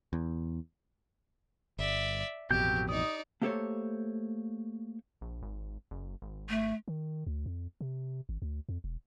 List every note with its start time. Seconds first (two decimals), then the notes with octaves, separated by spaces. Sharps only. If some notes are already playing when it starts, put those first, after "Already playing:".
0.13 E2
1.79 G1 D5 E5
2.50 A1 F2 B2 F#3 G4 G5 G6
2.89 D#4 D5 D#6
3.42 A3 A#3 G4 A4 C5 C#5
5.21 A#1
5.42 G#1
5.91 F#1
6.22 G#1
6.49 A3
6.88 D#3
7.27 D2
7.46 F2
7.81 C3
8.29 G#1
8.42 D2
8.69 F2
8.84 E1